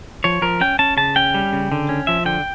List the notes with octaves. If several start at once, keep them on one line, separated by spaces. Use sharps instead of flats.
F3 C#5
F3 A#4
C#4 G5
C#4 A5
C#3 A5
C#4 G5
G3
C#3
D3
C#4
F3 E5
D3 G5